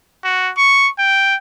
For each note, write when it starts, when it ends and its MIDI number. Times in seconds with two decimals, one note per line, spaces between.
0.24 0.52 66
0.57 0.89 85
0.99 1.35 79